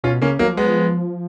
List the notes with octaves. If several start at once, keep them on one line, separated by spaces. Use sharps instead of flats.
B2 C#4 F4
C#3 A#3 C#4
D#3 F#3 A#3
F3
F#3 G#3 B3
F3